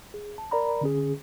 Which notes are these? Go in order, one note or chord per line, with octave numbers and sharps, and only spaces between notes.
G#4
A5
A#4 D5 A#5 B5
D3 C#4 G#4